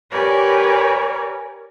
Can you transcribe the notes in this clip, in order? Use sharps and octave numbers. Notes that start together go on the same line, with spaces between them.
G4 A#4 B4 C#5 D5 G#5